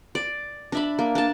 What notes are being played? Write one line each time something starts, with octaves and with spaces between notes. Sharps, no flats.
D5
D4 E5 B5
A#3
D4 A5